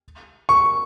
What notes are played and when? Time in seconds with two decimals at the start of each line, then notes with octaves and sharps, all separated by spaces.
0.49 C#6